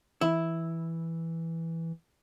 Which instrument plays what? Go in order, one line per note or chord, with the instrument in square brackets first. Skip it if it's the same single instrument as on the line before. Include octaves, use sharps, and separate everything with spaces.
[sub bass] E3 [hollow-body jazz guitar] E4